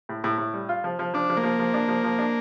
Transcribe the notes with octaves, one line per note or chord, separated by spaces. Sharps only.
A2
A2
A2
G3
F4
F3
F3
F3 D4
F3
A#3
F3
F3
D4
F3
F3
D4